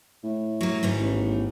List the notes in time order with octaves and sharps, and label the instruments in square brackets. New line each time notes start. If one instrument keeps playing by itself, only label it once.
[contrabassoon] A2
[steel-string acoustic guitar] F#3 A#3
G#2 D#3 B3
[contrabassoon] A1